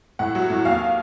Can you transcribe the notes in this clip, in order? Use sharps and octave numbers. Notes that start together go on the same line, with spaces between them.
A2 F#5
F#3
A2
D#2 F5